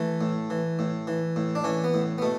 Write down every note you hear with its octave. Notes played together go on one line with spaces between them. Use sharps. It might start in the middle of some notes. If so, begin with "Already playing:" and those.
Already playing: E3 A3
A2
E3
A2
E3
A2
D4
E3 C#4
B3
A2
B3
B2 A3